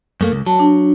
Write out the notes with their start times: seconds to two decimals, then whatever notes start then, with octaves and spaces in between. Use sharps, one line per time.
0.21 F#2 A3 A#3
0.32 C#2
0.46 F#3 A5
0.59 D4